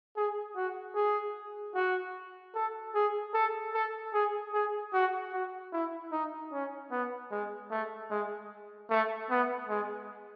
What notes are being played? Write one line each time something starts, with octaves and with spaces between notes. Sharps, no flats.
G#4
F#4
G#4
F#4
A4
G#4
A4
A4
G#4
G#4
F#4
F#4
E4
D#4
C#4
B3
G#3
A3
G#3
A3
B3
G#3